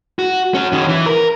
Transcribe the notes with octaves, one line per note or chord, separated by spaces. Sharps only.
F#4
C#4 F#4
D#3 C#4
E3
A#4